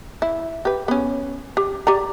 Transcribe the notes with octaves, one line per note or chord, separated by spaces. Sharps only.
E4
G4 B4
B3 C#4
G4
G4 D5 A#5